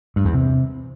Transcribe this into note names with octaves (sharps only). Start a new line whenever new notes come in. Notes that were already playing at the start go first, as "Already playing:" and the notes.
G2
E2
C3